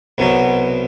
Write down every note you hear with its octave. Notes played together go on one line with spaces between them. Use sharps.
C2 B2 F#3